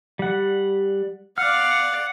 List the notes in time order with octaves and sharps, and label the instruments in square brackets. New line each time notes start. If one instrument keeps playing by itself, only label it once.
[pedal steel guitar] G3 F#5
[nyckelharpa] D5 F5 [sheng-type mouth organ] F#5 [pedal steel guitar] F6